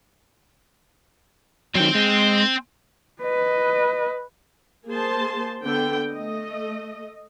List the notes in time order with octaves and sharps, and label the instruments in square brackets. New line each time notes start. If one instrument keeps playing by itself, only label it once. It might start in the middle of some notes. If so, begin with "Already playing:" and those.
[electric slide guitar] D#3 F#3 [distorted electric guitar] C4 G5
[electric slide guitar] G#3
[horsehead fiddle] B4 D#5
[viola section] A#3 G#4 C5 A5 C6
D3 B3 G5
A3 D#5